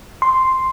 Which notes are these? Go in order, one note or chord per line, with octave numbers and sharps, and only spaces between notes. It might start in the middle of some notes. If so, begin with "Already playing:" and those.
C6